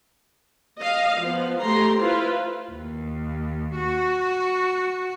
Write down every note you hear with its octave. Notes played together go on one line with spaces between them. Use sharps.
D#5 F5
F3 B3
A3 G4 A#5 C6
E4 F4 B4 C5
D#2
F#4